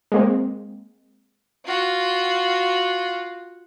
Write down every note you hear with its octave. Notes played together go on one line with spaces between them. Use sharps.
G#3 A#3 C4
F4 F#4